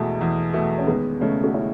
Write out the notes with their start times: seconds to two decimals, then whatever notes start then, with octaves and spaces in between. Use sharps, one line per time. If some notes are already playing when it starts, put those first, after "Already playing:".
Already playing: E2 B2 E3 G#3 A3
0.21 E2
0.54 B2 A3
0.78 C#4
0.87 D#2 G#3 B3
1.20 C#3 G#3 A3 C#4
1.44 F#4
1.54 C#4 E4